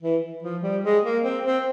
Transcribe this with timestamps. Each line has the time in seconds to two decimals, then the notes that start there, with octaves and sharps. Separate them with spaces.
0.02 E3
0.43 F3
0.63 G3
0.84 G#3
1.04 A#3
1.24 C4
1.45 C4